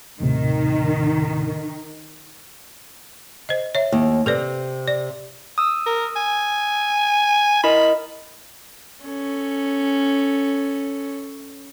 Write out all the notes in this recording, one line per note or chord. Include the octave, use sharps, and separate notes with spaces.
D#2 A2 C3 D#3
C5 D#5
C#5 E5
D#2
C3 A4 B4 D5
D5
D#6 E6
A#4
G#5
E4 A#4 D#5 B5
C#4 A4